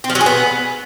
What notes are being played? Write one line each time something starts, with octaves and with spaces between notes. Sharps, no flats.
C4
F3
F#3
G#4
B3